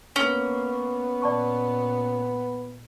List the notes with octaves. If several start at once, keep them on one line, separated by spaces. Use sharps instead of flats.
A#3 B3 C#4
A#2 D5 A5 C#6